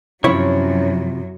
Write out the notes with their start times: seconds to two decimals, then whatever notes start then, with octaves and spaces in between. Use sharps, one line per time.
0.24 F#2 C3 F3 F#3 C#4 E4 C#5